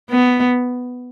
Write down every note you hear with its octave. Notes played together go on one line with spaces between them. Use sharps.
B3